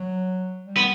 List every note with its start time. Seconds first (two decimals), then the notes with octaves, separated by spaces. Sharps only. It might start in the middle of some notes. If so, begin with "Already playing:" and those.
Already playing: F#3
0.64 G3
0.77 B3